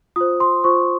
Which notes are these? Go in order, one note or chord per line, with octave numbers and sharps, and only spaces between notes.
F4 C5 D#6
C6
F4 C5 C#6